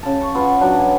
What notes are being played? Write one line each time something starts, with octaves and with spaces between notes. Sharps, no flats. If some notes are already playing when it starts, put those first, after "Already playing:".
C#3 A5
C#6
B3 F4
F#3 D4
G#5